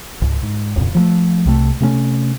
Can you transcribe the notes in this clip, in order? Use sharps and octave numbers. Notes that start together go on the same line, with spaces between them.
C#2 G#2
G#2
D1 F2 A#2 C#3
F3 F#3 A3
C2 C3 A3
C3 A3 B3 C#4